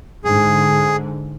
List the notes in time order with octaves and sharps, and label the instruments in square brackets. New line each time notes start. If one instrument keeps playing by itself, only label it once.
[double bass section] G#2 D3 [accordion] G#4